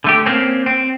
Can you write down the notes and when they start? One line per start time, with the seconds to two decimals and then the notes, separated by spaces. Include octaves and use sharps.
0.04 D3 A3 G4
0.25 A#3 C4 C#4
0.66 C4